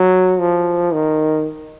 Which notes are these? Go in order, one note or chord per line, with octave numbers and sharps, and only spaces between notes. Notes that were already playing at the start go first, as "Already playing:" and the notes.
Already playing: F#3
F3
D#3